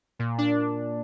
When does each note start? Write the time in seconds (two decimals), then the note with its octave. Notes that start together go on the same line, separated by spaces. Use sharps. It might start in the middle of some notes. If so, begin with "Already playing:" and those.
0.19 A#2
0.38 D4